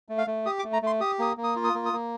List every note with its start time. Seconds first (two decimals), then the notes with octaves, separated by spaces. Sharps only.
0.09 A3
0.18 F5
0.27 A3
0.46 G4 D#6
0.59 D6
0.64 A3
0.73 A#5
0.82 A3 C6
1.00 G4 D#6
1.19 A#3 D#6
1.37 A#3
1.44 D#6
1.56 F4
1.64 D#6
1.75 A#3
1.86 D#6
1.93 A#3